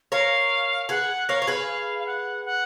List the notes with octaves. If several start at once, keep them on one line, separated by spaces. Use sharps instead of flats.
A#4 C#5 F5
G#4 B4 F#5
A#4 C#5 F5
C#5
G#4 B4
F5
F5
F#5
F#5